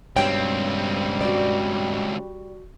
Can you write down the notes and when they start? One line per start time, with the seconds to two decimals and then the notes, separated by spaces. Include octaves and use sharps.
0.17 C#2 G2 B2 G3 C4 C#5 G5
1.21 F#4 D5